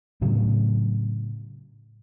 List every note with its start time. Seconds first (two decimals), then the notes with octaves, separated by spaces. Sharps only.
0.21 A2 C#3 F#3